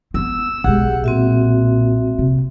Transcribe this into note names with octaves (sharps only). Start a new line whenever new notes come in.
B3 C4 E6
B1 G#3 G4 G#4 F#5
A#2 C4 F#4 E5
C3